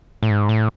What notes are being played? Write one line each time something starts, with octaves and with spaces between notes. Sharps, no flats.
A2
G#2
A2